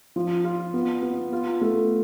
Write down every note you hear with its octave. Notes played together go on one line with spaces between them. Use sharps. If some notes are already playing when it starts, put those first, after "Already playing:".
F3
F4
B3
B3
F4
A3